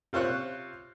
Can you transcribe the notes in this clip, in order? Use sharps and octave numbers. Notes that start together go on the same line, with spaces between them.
C3 F4 C5 C#5 F#6